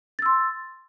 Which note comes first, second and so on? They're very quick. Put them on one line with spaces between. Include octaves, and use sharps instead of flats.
A6 E6 C6